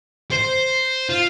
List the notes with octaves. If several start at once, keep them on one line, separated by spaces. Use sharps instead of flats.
C5
F4